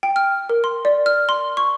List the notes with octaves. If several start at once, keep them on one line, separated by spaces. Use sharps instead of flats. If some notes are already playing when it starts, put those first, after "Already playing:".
G5
F6
A#4
C6
D5
F6
C6
C#6